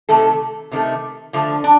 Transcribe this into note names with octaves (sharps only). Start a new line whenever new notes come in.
C3 D#3 A3 A4
C3 D#3 A3
D3 F3 A3 F4
D4